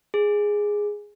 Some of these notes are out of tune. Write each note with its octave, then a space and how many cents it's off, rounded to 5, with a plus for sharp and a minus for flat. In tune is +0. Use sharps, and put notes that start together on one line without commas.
G#4 -5